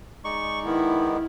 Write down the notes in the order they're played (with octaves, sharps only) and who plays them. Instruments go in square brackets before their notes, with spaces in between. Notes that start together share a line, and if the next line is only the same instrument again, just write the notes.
[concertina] G#3 D#4 D5 [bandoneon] C#6
[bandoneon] D#3 B3 [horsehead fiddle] E4